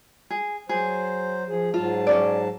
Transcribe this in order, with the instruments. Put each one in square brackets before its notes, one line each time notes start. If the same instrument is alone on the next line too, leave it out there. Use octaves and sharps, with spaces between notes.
[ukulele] G#4
[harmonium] F#3 C5 [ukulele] G#4
[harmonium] F3 G#4
[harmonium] G#2 F#3 A5 [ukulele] F4
[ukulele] C#4 D4 D5